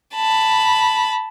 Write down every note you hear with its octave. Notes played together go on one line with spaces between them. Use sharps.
A5 B5